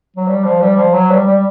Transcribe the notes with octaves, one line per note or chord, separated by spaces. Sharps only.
F#3
G3
F3
G3
F3
F#3
G3
G3